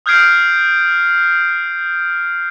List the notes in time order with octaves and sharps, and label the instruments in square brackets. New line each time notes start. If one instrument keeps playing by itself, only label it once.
[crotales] D#6 F6 G6 G#6 C7 D7